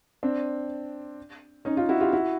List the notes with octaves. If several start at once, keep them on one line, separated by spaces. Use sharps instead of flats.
C4 D4
C#4 D#4
D#4 F4
E4 F#4
F4 G4
E4 F#4